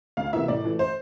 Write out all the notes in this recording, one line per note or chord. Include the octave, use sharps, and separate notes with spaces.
D2 F5
C3 E3 A#3 E5
A2 D5
E3 A3
C5